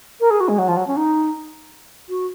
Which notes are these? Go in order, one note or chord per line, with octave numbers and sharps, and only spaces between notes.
A#4
G#4
F#4
G#3
F#3
F3
F#3
C#4
D#4
F#4